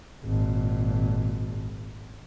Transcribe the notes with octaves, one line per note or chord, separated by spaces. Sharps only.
G#1 A#2